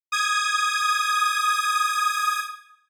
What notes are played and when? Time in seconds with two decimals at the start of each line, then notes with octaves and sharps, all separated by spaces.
0.12 D#6 G#6